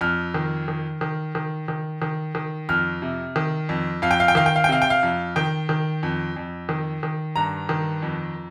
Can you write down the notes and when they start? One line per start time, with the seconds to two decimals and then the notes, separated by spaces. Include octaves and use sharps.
0.01 F2 F6
0.34 D#3
0.68 D#3
1.01 D#3
1.35 D#3
1.68 D#3
2.02 D#3
2.35 D#3
2.69 F2 F6
3.02 C3
3.36 D#3
3.69 F2
4.02 F2 F5
4.11 G5
4.20 F5
4.28 G5
4.35 D#3 F5
4.46 G5
4.56 F5
4.64 G5
4.69 C3 F5
4.82 G5
4.90 F5
5.03 F2
5.36 D#3 G5
5.69 D#3
6.03 F2
6.37 F2
6.69 D#3
7.03 D#3
7.36 G2 A#5
7.69 D#3
8.02 F2